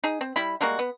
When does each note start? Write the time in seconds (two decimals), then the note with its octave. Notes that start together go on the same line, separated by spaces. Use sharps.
0.04 D#4 G#4
0.21 C4
0.36 G3 E4 B5
0.61 G3 G#3 A#3 F#4
0.79 B3